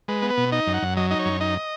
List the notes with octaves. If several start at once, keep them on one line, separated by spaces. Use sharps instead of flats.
G#3 B4
B3
B4
B2
D#4 D#5
F#2
F#5
F#2
F#3 D#5
D#4 D#5
C#5
F#2
D#4 D#5